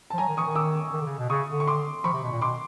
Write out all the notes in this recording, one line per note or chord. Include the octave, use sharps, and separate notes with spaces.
F3 A5
F#3 G#5 A#5
D#3
E3 C#6 D#6
D#3
D6 E6
D#3
D3
C#3
B2
C#3 C#6 D#6
D3
C#6
C6 D6
F3 B5 C#6
C3
B2
A#2
B2 C6 D6